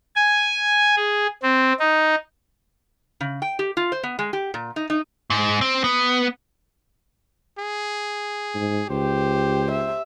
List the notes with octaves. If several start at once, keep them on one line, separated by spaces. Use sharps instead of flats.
G#5
G#4
C4
D#4
C#3
G5
G4
F4
C5
B3
G#3
G4
A#2
D#4
D#4
G#2
C4
B3
G#4
G#2
C#2 G4 C5
E5